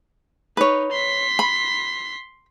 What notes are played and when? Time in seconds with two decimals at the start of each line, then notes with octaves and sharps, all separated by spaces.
0.57 D#4 B4 C#5
0.92 C6 B6
1.39 B5